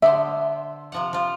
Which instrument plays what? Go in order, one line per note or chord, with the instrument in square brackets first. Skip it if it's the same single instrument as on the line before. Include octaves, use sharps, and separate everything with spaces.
[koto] D3 B3 C5 [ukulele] E5
[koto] C3 F3 F#5
F3 F4